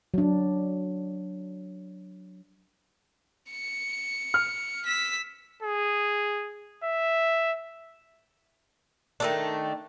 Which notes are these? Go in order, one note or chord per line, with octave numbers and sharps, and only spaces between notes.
F#3 D4
C#7
F6
E6 B6
G#4
E5
D#3 A3 D4